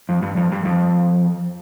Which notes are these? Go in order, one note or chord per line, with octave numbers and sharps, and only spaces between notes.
F2
G2
F2
G2
F2